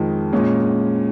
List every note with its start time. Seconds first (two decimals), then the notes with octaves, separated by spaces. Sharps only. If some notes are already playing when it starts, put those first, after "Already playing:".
Already playing: F2 D#3 G#3
0.33 A#2 G#3 C#4